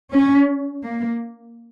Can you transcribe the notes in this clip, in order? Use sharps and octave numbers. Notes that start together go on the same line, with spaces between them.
C#4
A#3